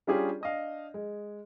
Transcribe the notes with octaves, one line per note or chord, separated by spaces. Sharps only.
G3 C#4 D4 F4 G4 G#4
D4 D#5 F5
G#3